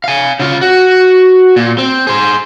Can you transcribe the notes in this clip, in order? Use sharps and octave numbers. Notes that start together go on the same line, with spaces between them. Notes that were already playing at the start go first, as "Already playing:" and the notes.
F5 G#5
C#3 F4
F#4
A#2
C4
G#4 C5